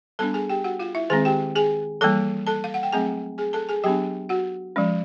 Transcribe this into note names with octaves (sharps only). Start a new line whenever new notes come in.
G3 B3 D4 A4 A5
G#4 G#5
G4 G5
F#4 F#5
F4 F5
E4 E5
D#3 G#3 C4 G#4 G#5
G4 G5
G#4 G#5
E3 G3 A#3 A4 A5
A4 A5
F5
F#5
G5
F#3 A3 C4 G#4 G#5
G#4 G#5
A4 A5
G#4 G#5
F#3 B3 D4 G4 G5
F#4 F#5
F3 G#3 C#4